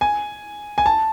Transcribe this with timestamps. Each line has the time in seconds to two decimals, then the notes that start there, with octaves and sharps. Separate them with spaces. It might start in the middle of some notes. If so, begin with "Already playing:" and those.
0.01 G#5
0.78 G#5
0.86 A5